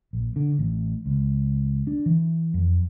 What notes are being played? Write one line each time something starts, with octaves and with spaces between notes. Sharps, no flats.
A#1
D3
A1
C#2
D4
E3
F2